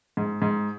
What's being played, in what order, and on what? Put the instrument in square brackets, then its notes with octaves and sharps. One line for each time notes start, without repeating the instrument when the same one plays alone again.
[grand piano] G#2
G#2